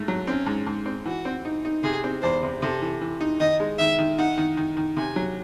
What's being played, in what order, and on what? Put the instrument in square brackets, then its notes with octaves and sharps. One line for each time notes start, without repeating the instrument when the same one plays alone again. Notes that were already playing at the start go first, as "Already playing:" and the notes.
Already playing: [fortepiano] G#2 A3
F#3
[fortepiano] C4 [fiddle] C#4
[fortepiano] G#2
G#2
C4
[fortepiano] E3 [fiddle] F#4
[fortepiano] C4
D#4
D#4
[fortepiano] C3 [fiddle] G#4
[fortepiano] C4
[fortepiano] E2 [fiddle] C5
[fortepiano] C3
[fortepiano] C3 [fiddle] A4
[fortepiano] E3
E3
D#4
[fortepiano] D#3 [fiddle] D#5
[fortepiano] G#3
[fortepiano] D#3 [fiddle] E5
[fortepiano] D#3
[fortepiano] D#4 [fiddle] F#5
[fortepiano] D#3
D#3
D#3
[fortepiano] C3 [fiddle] G#5
[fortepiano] F#3